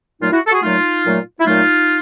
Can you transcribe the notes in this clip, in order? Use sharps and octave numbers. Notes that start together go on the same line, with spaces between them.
A#2 F#3 A3 D#4 F4
E4 F#4
A4
F#4 G#4
A#2 F#3 A3 D#4 F4
A#2 F#3 A3
E4
A#2 F#3 A3 D#4 F4